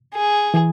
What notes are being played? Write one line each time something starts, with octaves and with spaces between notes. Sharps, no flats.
G#4
E3